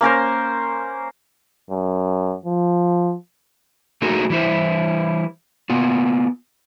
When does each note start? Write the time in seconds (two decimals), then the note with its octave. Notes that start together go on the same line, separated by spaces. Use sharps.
0.01 A#3 C#4 A#4 C5
1.71 F#2
2.45 F3
4.02 A3 A#3 D#4 F#4 G#4 A#4
4.30 E3 G3 E4 C5
5.70 A#3 B3 F4